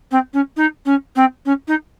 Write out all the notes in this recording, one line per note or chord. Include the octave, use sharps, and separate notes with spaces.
C4
C#4
D#4
C#4
C4
C#4
D#4